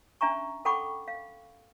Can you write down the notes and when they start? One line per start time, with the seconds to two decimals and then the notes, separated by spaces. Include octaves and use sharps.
0.21 C#4 D4 E5 G#5 A#5 C#6
0.65 A4 F#5 G5 B5 C#6 D6
1.08 F5